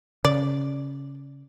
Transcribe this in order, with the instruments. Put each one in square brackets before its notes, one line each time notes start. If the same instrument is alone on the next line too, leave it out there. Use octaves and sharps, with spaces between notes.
[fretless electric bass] C#3 [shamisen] D5